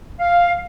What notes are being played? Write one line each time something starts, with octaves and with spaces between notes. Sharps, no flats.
F5